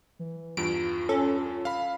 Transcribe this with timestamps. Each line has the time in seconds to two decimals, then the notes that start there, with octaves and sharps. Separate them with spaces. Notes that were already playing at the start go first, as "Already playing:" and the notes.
0.19 E3
0.57 E2 G2 F4 D7
1.09 C#4 A4
1.65 F5 B5